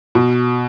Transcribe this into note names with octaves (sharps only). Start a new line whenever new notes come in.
B2